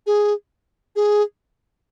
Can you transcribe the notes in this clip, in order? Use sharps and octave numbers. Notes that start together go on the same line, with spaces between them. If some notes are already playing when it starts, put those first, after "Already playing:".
G#4
G#4